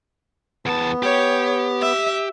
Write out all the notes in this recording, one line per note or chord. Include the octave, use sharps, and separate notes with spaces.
E2 B3 A5
G4 C#5
E5